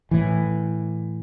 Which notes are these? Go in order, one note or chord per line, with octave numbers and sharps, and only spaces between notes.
A2 E3